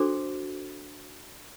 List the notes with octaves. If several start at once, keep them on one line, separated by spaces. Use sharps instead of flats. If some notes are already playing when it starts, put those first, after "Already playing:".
Already playing: D4 F#4 A4 C5 D6